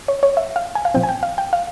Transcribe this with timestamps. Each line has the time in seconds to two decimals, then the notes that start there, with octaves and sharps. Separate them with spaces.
0.08 C#5
0.23 C#5
0.37 E5
0.56 F5
0.75 G#5
0.85 F5
0.94 A#2 F3 C4 G5
1.03 G#5
1.09 G5
1.23 F5
1.38 G5
1.53 F5